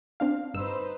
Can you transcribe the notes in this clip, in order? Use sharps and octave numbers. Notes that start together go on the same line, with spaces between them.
C4 D4 F5
G1 G2 D#4 B4 C5 E6